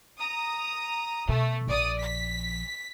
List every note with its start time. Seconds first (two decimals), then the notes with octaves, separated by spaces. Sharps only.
0.16 A#5 D#6
1.29 B2 A3
1.67 A#1 F3 D5 D#6
2.01 B6